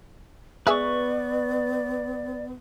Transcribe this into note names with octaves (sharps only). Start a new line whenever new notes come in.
G#3 B3 G#4 B4 D5 E5 C#6